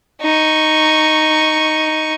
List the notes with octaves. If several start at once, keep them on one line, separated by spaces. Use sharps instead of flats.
D#4 C#6